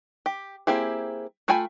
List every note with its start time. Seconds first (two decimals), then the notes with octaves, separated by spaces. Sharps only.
0.26 G4
0.67 A#3 C4 E4 G4 G#4
1.48 A3 F4 G5 G#5 B5